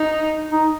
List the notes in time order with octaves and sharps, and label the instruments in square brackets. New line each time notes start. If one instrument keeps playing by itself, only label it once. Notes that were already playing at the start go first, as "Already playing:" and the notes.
Already playing: [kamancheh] D#4
[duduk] D#4